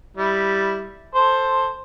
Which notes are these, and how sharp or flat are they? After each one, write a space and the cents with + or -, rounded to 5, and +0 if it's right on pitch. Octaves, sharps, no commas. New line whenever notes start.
G3 +0 E4 -10
A4 +0 C5 +5